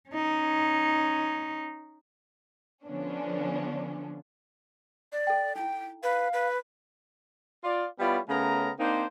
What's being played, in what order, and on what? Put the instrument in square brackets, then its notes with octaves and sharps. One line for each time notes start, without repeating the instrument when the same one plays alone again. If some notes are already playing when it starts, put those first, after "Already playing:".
[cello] C#4 D#4
[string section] D3 F3 B3 C#4 D4
[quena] D5
[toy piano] A4 G5
[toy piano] D#4 E4 [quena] G5
[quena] B4 [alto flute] F5
[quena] B4
[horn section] F4 D5
G3 B3 E4 F4 C#5 D5
C#3 A3 B3 C#4 A#4 A#5
A#3 C4 D4 D#4 C5